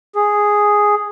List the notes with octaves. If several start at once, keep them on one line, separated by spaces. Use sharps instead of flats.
G#4